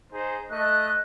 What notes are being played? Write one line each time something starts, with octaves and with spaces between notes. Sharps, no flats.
D#4 G#4 C5
A3 D#5 F#6